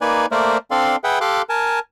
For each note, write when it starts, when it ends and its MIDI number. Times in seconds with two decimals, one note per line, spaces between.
0.01 0.26 58
0.01 0.26 63
0.01 0.26 71
0.01 0.26 74
0.01 0.26 80
0.32 0.58 57
0.32 0.58 58
0.32 0.58 70
0.32 0.58 72
0.32 0.58 74
0.32 0.58 76
0.71 0.96 60
0.71 0.96 62
0.71 0.96 69
0.71 0.96 74
0.71 0.96 77
0.71 0.96 84
1.04 1.19 68
1.04 1.19 71
1.04 1.19 76
1.04 1.19 78
1.04 1.19 79
1.21 1.42 67
1.21 1.42 69
1.21 1.42 77
1.21 1.42 84
1.21 1.42 86
1.21 1.42 90
1.49 1.79 70
1.49 1.79 80
1.49 1.79 81